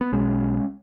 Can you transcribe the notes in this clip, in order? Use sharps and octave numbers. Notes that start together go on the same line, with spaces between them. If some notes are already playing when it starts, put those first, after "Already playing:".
B3
B1 B2 G#3 C#4